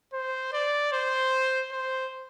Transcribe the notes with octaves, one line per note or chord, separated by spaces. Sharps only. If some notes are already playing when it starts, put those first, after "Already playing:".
C5
D5
C5
C5